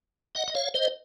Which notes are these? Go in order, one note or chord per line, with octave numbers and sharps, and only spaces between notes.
D#5 F#5
D#5
C#5 F5
C5 D#5